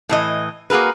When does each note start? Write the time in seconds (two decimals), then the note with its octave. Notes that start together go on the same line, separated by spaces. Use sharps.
0.09 A2 E3 D#5
0.70 A#3 F#4 G#4 A#4 B4